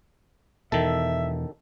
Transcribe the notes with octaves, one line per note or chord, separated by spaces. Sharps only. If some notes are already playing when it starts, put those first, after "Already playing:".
E2 B2 D#3 A4 E5